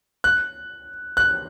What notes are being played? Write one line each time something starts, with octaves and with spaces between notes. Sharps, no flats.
F#6
F#6